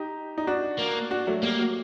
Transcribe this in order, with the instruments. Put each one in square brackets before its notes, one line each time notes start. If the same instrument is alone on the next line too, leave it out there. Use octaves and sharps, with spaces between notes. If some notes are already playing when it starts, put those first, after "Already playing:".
Already playing: [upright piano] D#4 G4
D#4
D4 F#4
[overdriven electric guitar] A#3
[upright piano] D4 F#4
F#3 A3
[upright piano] G3 [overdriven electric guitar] A#3
[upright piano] F#3